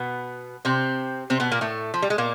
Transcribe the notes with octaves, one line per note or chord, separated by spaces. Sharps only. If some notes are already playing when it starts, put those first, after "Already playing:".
Already playing: B2 B3
C3 C4
C3 C4
B2 B3
A#2 A#3
A2 A3
F3
G3
G#3
A#2 A#3